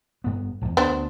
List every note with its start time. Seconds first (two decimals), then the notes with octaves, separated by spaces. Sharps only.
0.24 G2 B3
0.61 D1 E2
0.77 D2 B3 D4 C5